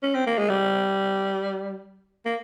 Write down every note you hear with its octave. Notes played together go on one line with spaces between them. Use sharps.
C#4
C4
A#3
G#3
G3
A#3